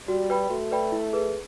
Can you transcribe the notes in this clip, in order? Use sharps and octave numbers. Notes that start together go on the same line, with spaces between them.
G3 F#4
B4 D5 G5 B5
A3 F#4
B4 D5 G5 B5
E4
G#4 B4